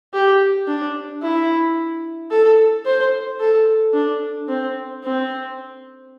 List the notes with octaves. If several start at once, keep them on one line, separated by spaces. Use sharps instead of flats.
G4
D4
E4
A4
C5
A4
D4
C4
C4